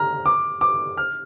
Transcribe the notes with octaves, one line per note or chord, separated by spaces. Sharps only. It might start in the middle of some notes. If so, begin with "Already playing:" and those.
Already playing: A#5 F6
D6
D6
F6